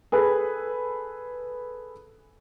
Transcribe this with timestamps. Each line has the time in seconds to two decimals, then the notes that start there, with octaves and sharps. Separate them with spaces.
0.12 G#4 A4 B4